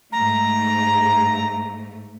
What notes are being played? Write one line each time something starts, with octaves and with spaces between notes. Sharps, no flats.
G#2 A3 A#5